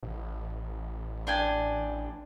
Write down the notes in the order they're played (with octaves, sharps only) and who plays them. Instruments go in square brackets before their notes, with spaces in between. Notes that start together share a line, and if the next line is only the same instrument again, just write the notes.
[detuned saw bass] A1
[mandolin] D4 G5 G#5